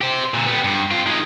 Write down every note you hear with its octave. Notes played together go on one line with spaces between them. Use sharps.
G4 C5
A#2 D3
G3 B3
G2
C4 F4
D#3 G#3